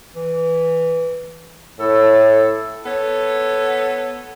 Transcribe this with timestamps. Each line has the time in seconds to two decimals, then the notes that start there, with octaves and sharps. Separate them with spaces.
0.15 E3
1.80 A2 A4
2.86 B3 A4 C#5